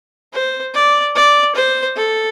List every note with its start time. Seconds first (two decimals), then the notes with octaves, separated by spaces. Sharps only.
0.33 C5
0.74 D5
1.15 D5
1.56 C5
1.96 A4